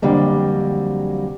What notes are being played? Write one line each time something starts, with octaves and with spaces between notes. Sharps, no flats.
F2 D3 F#3 G3 A#3